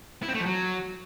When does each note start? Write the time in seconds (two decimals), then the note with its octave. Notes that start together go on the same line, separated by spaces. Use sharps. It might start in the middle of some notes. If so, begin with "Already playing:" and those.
0.23 E4
0.28 C4
0.34 A3
0.40 F3
0.46 F#3